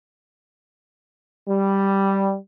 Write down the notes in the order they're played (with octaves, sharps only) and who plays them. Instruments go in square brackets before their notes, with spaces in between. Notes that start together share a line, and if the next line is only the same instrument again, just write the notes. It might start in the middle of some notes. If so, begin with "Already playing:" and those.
[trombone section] G3